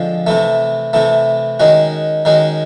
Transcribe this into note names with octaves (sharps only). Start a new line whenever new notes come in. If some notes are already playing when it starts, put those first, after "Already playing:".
Already playing: D3 F3 G#3 C4
C3 E3 A3
C3 E3 A3
D#3 G#3 C#4 F#4
D#3 G#3 C#4 F#4